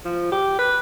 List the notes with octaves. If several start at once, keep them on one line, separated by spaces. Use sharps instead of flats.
F3
G4
B4